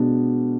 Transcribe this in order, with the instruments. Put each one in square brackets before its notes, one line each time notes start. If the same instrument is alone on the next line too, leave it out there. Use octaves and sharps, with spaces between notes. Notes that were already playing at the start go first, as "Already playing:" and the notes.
Already playing: [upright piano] B2 G#3 B3 D4